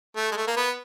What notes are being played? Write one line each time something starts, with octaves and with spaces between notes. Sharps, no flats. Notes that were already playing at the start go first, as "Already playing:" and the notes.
A3
G#3
A3
A#3
B3